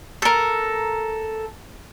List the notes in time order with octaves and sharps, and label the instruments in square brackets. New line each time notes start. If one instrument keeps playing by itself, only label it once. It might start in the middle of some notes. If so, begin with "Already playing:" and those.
[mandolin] A4 A#4